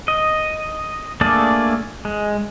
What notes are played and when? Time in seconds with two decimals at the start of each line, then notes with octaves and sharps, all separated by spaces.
0.08 D#5
1.21 A3 A#3 D4 G#4 D5
2.05 G#3